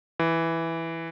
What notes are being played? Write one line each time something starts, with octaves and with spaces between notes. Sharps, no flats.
E3